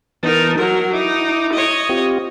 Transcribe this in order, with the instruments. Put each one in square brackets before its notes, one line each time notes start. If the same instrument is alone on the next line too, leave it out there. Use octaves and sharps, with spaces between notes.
[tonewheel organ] E3 B3 A5 [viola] D#4 A#4
[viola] F#3 A#4 [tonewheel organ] F#4
[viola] D#4 [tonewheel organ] E4 D6
[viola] C#5 D#5
[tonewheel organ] C4 F4 G4